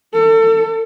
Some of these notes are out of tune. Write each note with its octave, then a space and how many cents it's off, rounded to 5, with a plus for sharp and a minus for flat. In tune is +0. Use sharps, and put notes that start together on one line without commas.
A4 +35